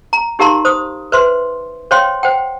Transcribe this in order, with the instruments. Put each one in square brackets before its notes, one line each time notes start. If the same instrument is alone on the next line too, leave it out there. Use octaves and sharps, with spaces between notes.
[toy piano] A#5
D#4 G4 A#4 F5 A#5 C6
C5 D#6
B4 C5 E5 C6
C5 C#5 F5 G5 C6
C5 F#5 G5